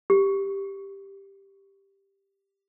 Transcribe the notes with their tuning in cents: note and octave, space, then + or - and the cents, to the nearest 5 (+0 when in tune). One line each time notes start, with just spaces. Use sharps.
G4 +5